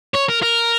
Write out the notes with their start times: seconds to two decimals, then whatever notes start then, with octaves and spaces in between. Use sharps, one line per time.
0.14 C#5
0.29 A#4
0.42 A#4